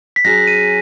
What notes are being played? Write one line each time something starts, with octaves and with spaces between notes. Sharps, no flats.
B6
F#3 C#4 G#4 A#6
D#7